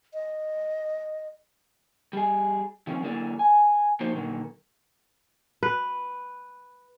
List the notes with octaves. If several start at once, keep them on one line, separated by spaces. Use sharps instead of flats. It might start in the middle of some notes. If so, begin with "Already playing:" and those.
D#5
G3 G#4
D#3 F3 A3 C4 C#4
D3 F#3 A#3 E4 G#4 D5
G#5
F3 A#3 D#4 F#4 C5
A#2 D3 D#3 F#3 A#3
B4